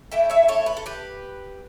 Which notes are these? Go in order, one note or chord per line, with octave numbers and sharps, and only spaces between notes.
D3 A3 E4 E5 G5
C#5 E5
A4 C#5
B4
A4
G4 B4